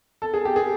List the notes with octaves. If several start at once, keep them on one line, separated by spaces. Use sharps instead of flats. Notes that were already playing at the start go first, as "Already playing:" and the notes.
A4
G#4
G4
G#4